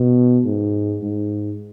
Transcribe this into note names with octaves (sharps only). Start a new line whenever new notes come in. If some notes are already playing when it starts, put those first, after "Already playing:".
Already playing: B2
G#2
G#2